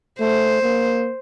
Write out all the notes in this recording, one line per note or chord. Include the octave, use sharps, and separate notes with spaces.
A3 C5
A#3